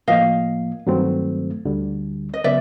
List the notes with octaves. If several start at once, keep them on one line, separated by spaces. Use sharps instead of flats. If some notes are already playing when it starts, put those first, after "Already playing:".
A2 F3 A#3 D#5 F5
G2 D#3 F#3 A3 C4
D2 D3 G3
D#5
C#3 F#3 B3 D5 E5